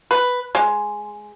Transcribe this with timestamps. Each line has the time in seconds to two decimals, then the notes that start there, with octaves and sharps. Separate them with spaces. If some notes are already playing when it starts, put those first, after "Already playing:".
0.11 B4
0.55 G#3